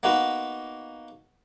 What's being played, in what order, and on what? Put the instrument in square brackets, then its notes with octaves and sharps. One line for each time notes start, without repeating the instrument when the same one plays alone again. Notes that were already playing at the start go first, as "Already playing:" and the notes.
[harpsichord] A#3 B3 D#4 F#4 B4